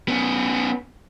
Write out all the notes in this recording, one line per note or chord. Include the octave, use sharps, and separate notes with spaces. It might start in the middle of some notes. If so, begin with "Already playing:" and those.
B3 C#4